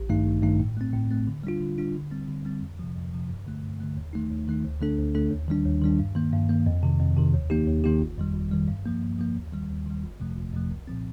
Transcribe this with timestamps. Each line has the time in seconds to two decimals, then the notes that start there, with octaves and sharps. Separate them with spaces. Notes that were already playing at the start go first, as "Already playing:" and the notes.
Already playing: A1
0.09 G2 D#3 A3 D#4
0.26 A1
0.43 G2 D#3 A3 D#4
0.60 A2
0.77 A3 C4
0.94 A2
1.11 A3 C4
1.27 D3
1.43 G3 D4 F4
1.61 D3
1.78 G3 D4 F4
1.95 D3
2.11 G3 C4
2.28 D3
2.45 G3 C4
2.62 F2
2.79 C3 F3
2.96 F2
3.13 C3 F3
3.30 G2
3.47 D3 A3
3.63 G2
3.80 D3 A3
3.97 D#2
4.13 D#3 A3 D#4
4.31 D#2
4.47 D#3 A3 D#4
4.64 D2
4.81 D3 A3 D4 A4
4.98 D2
5.15 D3 A3 D4 A4
5.31 D#2
5.48 D#3 G3 D4
5.65 D#2
5.82 D#3 G3 D4
5.99 G2
6.15 D#3 A#3
6.33 G2
6.49 D#3 A#3
6.66 F2
6.83 C3 D#3
7.00 F2
7.17 C3 D#3
7.33 D#2
7.50 D#3 A#3 D#4 G4
7.67 D#2
7.84 D#3 A#3 D#4 G4
8.01 G1
8.18 F2 D#3 G3
8.35 G1
8.52 F2 D#3 G3
8.68 G2
8.85 F3 A#3
9.02 G2
9.19 F3 A#3
9.36 D#2
9.52 D#3 G3
9.69 D#2
9.86 D#3 G3
10.03 G1
10.20 F2 C3 F3 A3
10.37 G1
10.53 F2 C3 F3 A3
10.71 C2
10.87 A#2 F3 C4